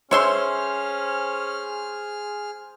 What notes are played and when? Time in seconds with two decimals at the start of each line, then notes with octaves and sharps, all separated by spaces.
0.11 C#4 G#4 C5 C#5 E5 C6 F6